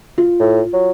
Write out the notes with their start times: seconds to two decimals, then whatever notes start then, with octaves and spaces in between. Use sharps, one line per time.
0.18 F4
0.40 A2
0.73 F#3